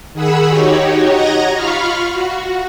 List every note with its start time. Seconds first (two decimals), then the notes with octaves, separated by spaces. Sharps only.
0.13 D#3 G#4 F#5 B5 E6
0.49 D#4 F#4 G4 C#5
1.11 D#5 F#5 A#5 G#6 A#6
1.54 F4 F5 B5 C#6 F6
2.11 F#4